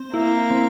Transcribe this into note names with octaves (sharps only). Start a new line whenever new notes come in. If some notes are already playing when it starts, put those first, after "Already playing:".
Already playing: C4
A#3 E4
C4